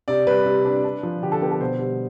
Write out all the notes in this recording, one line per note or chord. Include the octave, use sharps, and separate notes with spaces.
C3 D5
G3 B4
C3
D4
D4
F3
D3 G4
A4
B3 G4
A4
B2 C5
G3